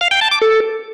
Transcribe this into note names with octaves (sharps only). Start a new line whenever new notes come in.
F5
G5
A5
D6
A4